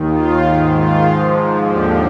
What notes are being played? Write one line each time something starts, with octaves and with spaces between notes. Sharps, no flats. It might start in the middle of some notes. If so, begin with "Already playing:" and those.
Already playing: D#2 D#3
F4
G#2 D#3 D#4
F4
G#2 F3
D#2 D3 F3 G4